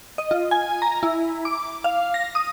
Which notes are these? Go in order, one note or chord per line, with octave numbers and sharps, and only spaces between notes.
D#5
F4
G#5
A#5
E4
D6
F5
A#6
D#6